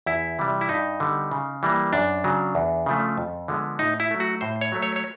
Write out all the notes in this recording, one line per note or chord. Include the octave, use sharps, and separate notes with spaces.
E2 E4
C3 E3 G3
E4
G2 D#4
D3 G3 B3
C#3
E3 G3 A#3
F#2 D4
C#3 F#3
E2
C#3 F3 A3
F2
D3 F3 G#3 B3
A2 D#4
E4
F#3 A3
F#4
A2 C5
C#5
F#3 A3
C#5
C#5